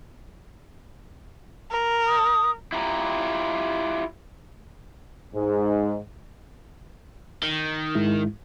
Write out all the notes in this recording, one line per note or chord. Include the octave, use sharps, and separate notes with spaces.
A#4
D#6
E4 F4 G4 A#5
G#2
D#3
G#2 G#3 E4